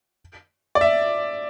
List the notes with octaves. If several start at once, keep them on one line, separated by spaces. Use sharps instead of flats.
D5
E5